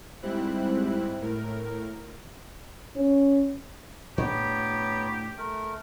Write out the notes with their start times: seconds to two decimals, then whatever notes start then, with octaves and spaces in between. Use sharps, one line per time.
0.22 G#2 G3 C4 E4 F#6
1.21 A2 A#4
2.96 C#4
4.18 A2 B3 D4 G4 C#5 A#5
5.38 A3 A#4